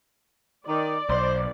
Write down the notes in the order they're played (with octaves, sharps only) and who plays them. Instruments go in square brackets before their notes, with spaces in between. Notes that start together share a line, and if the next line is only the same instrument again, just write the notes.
[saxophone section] D#3 D#4 [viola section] D5
[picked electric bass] B1 [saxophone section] C5